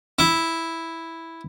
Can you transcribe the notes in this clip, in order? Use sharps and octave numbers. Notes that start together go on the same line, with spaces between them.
E4